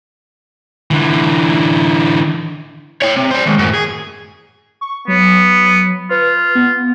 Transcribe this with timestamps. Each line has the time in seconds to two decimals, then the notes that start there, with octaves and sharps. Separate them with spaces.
0.91 D3 E3
3.02 C#5 G5
3.16 C3
3.31 D4 C5
3.45 D#2 G#2
3.59 F#2 A2
3.74 G#4
4.81 C#6
5.08 F#3 B3
6.10 F4 B4
6.55 B3